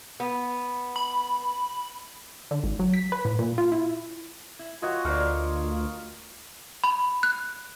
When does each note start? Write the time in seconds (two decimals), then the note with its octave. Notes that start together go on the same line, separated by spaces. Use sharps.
0.20 B3
0.96 B5
2.51 D3
2.64 G#1
2.79 F#3
2.94 B6
3.12 B4
3.25 A2
3.39 A#2
3.58 F4
3.72 E4
4.59 E4
4.82 E3 F4 F#4 A#4 C#5 D#5
5.05 D2 A3 A#4 C5 D5 F5
6.84 B5
7.23 F#6